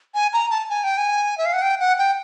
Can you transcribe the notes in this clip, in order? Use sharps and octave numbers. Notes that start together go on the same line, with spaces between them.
G#5
A#5
A5
G#5
G5
G#5
E5
F5
F#5
G5
F#5
G5